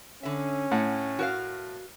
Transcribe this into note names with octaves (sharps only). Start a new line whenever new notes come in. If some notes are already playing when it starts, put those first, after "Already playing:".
D3 C#4 E5
A2 F#5
F#4 A#4 F5